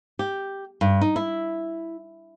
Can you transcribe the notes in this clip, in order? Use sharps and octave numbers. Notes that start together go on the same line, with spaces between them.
G4
G2
D#4
E4